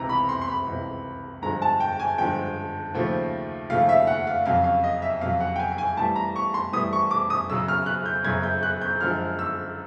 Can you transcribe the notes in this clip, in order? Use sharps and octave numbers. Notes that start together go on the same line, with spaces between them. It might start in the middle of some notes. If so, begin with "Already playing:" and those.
Already playing: C#2 C3 E3 A#5
B5
C6
C6
B5
C#2 C3 E3
G2 D3 F3 G#3 A#5
A5
G5
G#5
G2 D3 F3 G#3 G5
D#2 C#3 F3 A3
D#2 C#3 F3 A3 F5
E5
F#5
F5
F2 C#3 F#3 F5
F5
D#5
E5
F2 C#3 F#3 F5
F#5
G5
G#5
G#5
A2 E3 G3 A5
A#5
C#6
C6
A2 E3 G3 D#6
C#6
D6
D#6
F#2 C#3 F#3 E6
F6
F#6
G6
F#2 C#3 F#3 G#6
G6
F#6
G6
F#2 D3 F3 G#3 F6
E6